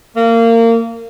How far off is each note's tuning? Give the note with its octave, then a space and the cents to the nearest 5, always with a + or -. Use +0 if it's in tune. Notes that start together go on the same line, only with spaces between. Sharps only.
A#3 -25